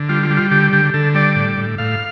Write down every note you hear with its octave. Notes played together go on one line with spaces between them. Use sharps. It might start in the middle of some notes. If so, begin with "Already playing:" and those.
Already playing: D3
G3 F4
F4
G3
F4
D3 G4
D3 G4
D3 A4
G3 D5
A2
A2
A2 F5